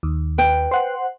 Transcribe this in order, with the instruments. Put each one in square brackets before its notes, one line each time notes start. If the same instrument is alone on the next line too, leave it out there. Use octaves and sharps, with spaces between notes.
[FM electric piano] D#2
[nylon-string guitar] B4 G5
[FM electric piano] C5 F#5